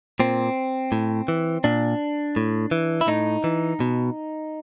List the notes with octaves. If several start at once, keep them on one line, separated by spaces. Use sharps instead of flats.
A#2 C4
A2
E3
A#2 D4
A2
E3
E4
A2 D#4
E3
B2